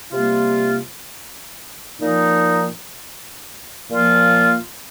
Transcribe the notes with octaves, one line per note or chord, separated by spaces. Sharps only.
C3 G3 A#3 F4
A#2 F3 D#4
A#2 F3 A#3 F4